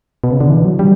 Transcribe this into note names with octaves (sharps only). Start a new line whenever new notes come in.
B2
C#3
D3
E3
F#3
G3